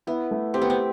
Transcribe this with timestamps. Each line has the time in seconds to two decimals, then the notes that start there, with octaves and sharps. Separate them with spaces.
0.07 B3 E4
0.31 A3
0.54 C4 G4
0.62 B3
0.70 C4